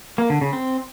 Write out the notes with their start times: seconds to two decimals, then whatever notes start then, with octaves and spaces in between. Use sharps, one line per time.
0.18 A#3
0.30 D3
0.41 C#3
0.53 C4